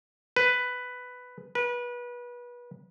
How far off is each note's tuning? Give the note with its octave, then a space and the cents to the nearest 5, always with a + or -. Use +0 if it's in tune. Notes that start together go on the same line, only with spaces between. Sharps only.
B4 +10
B4 -25